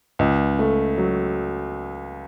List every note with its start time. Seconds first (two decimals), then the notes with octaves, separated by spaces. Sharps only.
0.19 C#2
0.59 A3
0.98 F#3